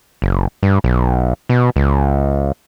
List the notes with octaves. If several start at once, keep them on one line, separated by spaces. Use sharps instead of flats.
F#1
G2
B1
B2
C#2